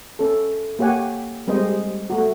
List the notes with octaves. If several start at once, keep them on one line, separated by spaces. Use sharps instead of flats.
C#4 A4
A#3 G4 C#5 F#5 G#5
G3 G#3 C4 C5 D#5
A3 F#4